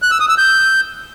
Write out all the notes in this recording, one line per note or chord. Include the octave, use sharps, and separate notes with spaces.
F#6
E6
D#6
E6
G6